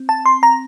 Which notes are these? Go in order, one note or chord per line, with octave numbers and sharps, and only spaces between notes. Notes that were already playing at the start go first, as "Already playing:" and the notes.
Already playing: C4
A5
C6
A#5